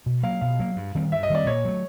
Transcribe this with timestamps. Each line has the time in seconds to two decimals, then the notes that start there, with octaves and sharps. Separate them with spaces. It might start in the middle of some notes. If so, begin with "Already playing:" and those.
0.06 B2
0.23 F#3 A#3 F5
0.41 B2 F5
0.59 F#3 A#3
0.76 G2
0.95 D#3 G3 C4
1.12 G2 E5
1.23 D#5
1.30 D#3 G3 C4 D5
1.46 A#2 C#5
1.65 F#3 A3